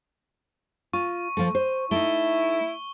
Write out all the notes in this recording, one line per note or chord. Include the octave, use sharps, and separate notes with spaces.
F4 C#6
F3 A3
C5
A3 D#4 E4 G7